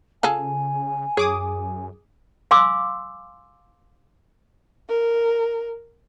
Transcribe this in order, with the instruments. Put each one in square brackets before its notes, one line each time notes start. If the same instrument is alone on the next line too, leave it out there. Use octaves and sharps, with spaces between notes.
[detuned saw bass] C#3 [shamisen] F4 G#4 A4 [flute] G#5
[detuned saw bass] F#2 [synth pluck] G#4 D6 D#6 [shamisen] C#5
[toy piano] F5 G#5 C6 D6 E6
[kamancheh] A#4